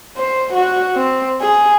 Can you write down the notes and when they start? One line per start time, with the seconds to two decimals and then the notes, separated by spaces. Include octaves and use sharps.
0.17 C5
0.53 F#4
0.96 C4
1.41 G#4